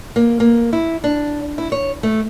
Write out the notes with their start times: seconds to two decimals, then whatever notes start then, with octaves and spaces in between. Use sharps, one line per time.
0.16 A#3
0.40 A#3
0.73 E4
1.04 D4
1.58 E4
1.72 C#5
2.03 A3